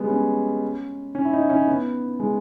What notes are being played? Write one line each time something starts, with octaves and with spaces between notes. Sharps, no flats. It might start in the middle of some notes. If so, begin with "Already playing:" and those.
Already playing: G3 G#3 B3
C#4
C#4
E4
D#4
C#4
B3
G#3